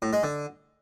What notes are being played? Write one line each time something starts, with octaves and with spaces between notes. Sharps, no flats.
A2
G#3
D3